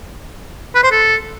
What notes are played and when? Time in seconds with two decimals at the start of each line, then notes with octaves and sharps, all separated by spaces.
0.75 B4
0.83 C5
0.91 A4